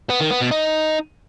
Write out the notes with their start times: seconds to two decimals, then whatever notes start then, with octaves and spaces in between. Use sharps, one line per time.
0.10 B3
0.20 D#3
0.31 B3
0.41 B2
0.51 D#4